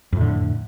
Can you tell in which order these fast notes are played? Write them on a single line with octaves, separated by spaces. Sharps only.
F2 A2 D3